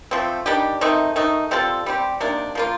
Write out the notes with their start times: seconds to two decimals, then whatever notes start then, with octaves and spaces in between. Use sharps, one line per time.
0.11 F3 A3 C4
0.46 D#3 G3 D4 G4
0.81 D#3 A3 C4 D#4
1.16 D#3 A3 D#4
1.51 G3 C4 F4 A4
1.86 G3 C4 G4
2.20 C3 D#3 A#3 D4
2.55 F3 A#3 F4